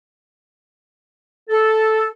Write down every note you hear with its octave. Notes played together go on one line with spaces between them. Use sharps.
A4